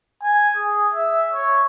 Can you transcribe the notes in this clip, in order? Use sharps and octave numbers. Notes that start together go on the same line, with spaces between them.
G#5
G#4
E5
C#5